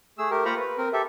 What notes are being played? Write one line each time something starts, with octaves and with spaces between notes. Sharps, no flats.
A3 G#4 E6
A3 G4 A#4
A#3 F4 C5 A#5 B5 C#6
B4
C4 A#4
G4 A4 E5